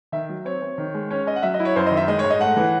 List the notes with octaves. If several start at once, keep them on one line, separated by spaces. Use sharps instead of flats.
D#3 E5
F#3
C4 C#5
C4
D#3
G#3
C#4 C#5
C#4 D#5
F#5
F#3 E5
D#5
E4
C#5
F#2 C5
D#5
D#3
E5
G#3 D#5
C#5
G#2
D#5
A3 F#5
E3